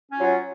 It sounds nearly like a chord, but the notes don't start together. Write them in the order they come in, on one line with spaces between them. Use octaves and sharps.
C#4 F4 F#3